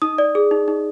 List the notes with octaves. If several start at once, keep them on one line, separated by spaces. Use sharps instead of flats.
D#4 D#6
D5
G#4
D#4
D#4